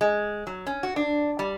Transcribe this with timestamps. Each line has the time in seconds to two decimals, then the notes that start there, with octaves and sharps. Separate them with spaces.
0.01 G#3
0.47 F#3
0.67 C#4
0.83 F#4
0.96 D4
1.39 G3